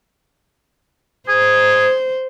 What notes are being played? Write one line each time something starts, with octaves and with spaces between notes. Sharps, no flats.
G#4 C5